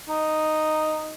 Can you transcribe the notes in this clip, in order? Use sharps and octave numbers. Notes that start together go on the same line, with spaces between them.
D#4